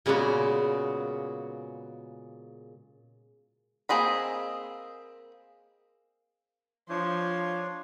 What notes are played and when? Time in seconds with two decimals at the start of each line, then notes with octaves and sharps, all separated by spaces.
0.06 A#2 C#3 G#3 A#3 B3 F#4
3.89 A#3 C4 G#4 D#5 B5
6.90 F3 D4 C#5 C6